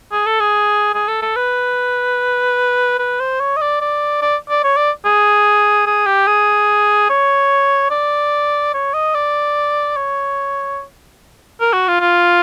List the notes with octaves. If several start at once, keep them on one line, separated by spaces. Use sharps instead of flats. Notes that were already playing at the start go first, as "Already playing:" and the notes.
G#4
A4
G#4
G#4
A4
A4
B4
B4
C5
C#5
D#5
D5
D5
D5
D5
C#5
D5
G#4
G#4
G4
G#4
C#5
D5
C#5
D#5
D5
C#5
A#4
F#4
F4
F4